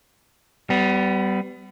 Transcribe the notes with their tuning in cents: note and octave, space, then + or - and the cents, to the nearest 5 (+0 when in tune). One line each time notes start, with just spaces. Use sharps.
G3 -20 B3 +25